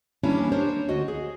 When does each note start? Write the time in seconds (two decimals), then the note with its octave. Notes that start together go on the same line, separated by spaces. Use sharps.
0.23 E3 G3 A#3 C#4 D4 E4
0.52 D4 A#4 C5 C#5
0.89 D2 F#4 D#5
1.08 G#4